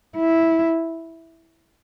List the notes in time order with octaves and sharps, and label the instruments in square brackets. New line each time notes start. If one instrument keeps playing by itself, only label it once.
[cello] E4